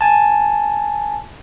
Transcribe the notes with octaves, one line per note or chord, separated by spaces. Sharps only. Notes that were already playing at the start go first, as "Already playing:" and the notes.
G#5 A5